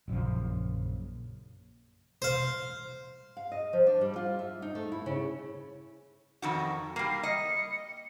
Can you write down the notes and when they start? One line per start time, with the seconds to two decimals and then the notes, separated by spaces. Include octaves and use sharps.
0.08 A#1 F#2 C#3 F3
2.22 C5 F5
3.37 F5
3.52 D#5
3.73 F3
3.87 D4
4.01 G3
4.16 F4
4.39 E5
4.62 D#4
4.75 A3
4.92 E4
5.06 C#3
6.42 F2 D#3 F#4
6.96 G3 A#3 C7
7.23 D#5 C#7